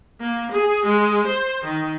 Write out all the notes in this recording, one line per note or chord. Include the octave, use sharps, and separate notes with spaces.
A#3
G#4
G#3
C5
D#3